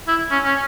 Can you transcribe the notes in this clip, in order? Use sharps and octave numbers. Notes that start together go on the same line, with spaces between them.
E4
C#4
C#4